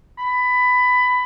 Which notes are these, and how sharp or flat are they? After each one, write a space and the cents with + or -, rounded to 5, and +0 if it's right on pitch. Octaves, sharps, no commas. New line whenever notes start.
B5 +15